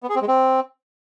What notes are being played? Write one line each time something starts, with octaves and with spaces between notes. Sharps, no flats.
B3
G#4
C4
G#3
C4